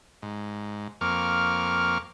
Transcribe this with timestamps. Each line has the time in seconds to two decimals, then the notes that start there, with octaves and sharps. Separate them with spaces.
0.22 G#2
1.01 F2 A#3 C#6 D6 F6